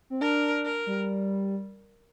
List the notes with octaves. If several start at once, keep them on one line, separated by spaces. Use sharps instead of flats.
C4
D4 A#4
A#4
G3